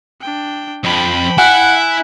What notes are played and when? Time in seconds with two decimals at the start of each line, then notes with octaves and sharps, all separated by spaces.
0.22 D4 G5
0.84 F2 G5 B5
1.38 E4 F#5 G#5 F#6